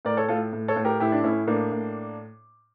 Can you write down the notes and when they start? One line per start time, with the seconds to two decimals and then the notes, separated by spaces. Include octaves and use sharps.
0.05 A2 A#4 D5
0.17 A4 C#5
0.28 A2 F4 A4
0.53 A2
0.68 A4 C#5
0.76 A2
0.85 G4 A#4
1.00 A2 E4 G4
1.12 D4
1.24 A2 C#4 E4
1.47 A2 A#3 D4
1.72 A2